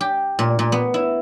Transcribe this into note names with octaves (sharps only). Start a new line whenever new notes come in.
G4
A#2
A#2
B3
E4